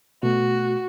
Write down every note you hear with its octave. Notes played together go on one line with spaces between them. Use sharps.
B2 A3 F#4